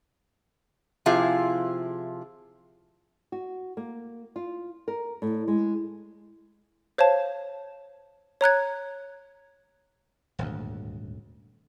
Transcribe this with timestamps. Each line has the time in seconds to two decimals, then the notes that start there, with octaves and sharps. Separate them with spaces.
1.06 C3 F3 E4 F4 G#4
3.32 F#4
3.77 A#3
4.36 F4
4.88 A#4
5.22 A2
5.48 G#3
6.98 C5 C#5 F5 A5
8.41 C#5 A#5 F#6 G#6
10.39 D#1 G#1 D2